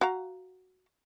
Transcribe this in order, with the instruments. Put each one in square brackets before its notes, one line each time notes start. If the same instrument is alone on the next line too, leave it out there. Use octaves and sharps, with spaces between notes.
[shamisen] F#4 F5 A#5